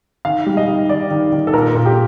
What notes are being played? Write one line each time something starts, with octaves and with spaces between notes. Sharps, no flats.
D#3 F5
G3
D#5
D#3
D#3 D5
D#3
D#3
A4
A#2 A#4
A#2
G4